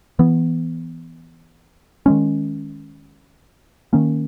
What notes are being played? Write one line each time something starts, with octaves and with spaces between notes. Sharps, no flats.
E3 B3
D#3 G#3 C#4
D#3 A#3 C#4